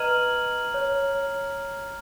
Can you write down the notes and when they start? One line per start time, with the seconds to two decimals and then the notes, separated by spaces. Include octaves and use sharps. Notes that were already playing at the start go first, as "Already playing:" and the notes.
Already playing: B4 D#5 A#5 F6 G#6 D#7 F#7
0.74 C#5
0.95 C#5
1.15 C#5